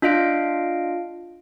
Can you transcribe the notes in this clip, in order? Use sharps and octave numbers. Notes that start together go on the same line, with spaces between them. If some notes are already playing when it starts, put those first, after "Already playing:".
D4 F4 D#5 F5 D7